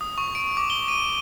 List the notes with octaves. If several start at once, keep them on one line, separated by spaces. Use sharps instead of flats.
D#6
C#6
D7
D6
G7
D#7